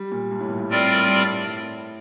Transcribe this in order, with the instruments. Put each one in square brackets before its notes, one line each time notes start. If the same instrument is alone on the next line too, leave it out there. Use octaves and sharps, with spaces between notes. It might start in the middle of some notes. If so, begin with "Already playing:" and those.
Already playing: [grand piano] G3
A#2
G2
A2
A#2
A2
[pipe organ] G3 C4 F4 A#4 D5
[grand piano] G2
A2